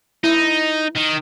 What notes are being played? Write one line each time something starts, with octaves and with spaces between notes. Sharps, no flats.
D#4 E4
D#3